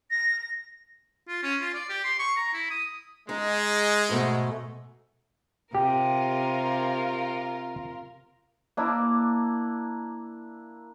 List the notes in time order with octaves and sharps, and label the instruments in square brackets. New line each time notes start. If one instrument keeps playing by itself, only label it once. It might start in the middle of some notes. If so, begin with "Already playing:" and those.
[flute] A#6
[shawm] F4
C#4
F4
D5
G4
C6
C#6
A#5
E4
D#6
[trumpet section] G#3 [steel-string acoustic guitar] D#4
[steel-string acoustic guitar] G#2 B2 A3
[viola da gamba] C3 [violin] F4 A#4 [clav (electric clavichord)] G4
[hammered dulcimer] A#3 D4 E4